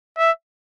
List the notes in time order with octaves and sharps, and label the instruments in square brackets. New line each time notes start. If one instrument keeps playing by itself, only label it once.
[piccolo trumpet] E5